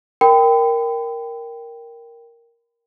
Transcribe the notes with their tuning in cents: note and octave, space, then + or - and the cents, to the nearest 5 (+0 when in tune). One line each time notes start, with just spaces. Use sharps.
A#4 +0 G5 +0 B5 +40